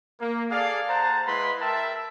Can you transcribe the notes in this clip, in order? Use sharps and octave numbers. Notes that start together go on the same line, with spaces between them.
A#3
G#4 A4 D5 F5
C5 F#5 A5 A#5
G#3 E4 B4 B5 C6
A#4 E5 G5 A5